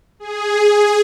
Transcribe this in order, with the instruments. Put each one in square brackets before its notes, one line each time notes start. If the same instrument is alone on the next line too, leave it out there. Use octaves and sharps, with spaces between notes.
[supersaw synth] G#4